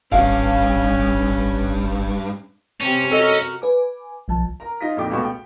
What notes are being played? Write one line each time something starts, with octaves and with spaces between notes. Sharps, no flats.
D#1 G#1 G2 C#4 F5
C3 C#4 G4
F#4 A4 A#4 D#5
B4 G#5 D6
B1 F3 A5
A#4 A#5
D#4 F4 A#6 B6
F2 A#2 D#4 F#4 G5 D6
C#2 B2 A3 F#4 C#6
G5